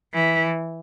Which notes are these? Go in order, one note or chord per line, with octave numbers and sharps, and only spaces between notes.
E3